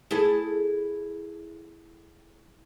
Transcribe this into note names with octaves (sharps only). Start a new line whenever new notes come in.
E4 G#4 A4